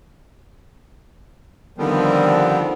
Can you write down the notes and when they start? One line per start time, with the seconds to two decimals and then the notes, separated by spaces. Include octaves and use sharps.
1.78 D3 D#3 F3 G3 B3 C4